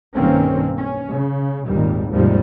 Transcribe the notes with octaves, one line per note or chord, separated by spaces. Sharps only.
B1 G2 D#3 A#3 C4 C#4
C#4
C#3
G#1 D#2 A#2 G3
D#2 G#2 C3 F3 G3